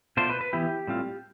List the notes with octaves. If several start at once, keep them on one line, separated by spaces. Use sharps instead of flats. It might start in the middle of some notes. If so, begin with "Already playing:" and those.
B2 A3 D4 F4 C5
B4
B4
E3 B3 E4 G4
A2 G3 C4 F4